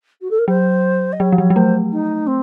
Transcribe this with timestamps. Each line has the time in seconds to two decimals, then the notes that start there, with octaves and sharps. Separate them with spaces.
0.21 F#4
0.30 A4
0.38 A#4
0.48 F#3 C5
1.12 D#5
1.20 F#3 C#5
1.32 F3
1.37 F#3 C#5
1.50 F#3
1.56 A3 C5
1.91 D#4
2.27 C4